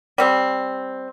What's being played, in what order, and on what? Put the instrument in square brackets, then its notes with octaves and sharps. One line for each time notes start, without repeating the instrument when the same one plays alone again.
[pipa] G3 C4